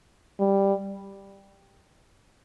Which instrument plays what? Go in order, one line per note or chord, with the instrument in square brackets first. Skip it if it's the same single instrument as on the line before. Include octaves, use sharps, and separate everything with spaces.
[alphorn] G3